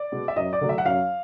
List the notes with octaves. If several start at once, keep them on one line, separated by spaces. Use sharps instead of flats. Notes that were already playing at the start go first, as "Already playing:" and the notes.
Already playing: D5
B2 G#3 B3
E5
F#2 D#5
D5
D3 F#3 A3
E5
F#5
F#2 F5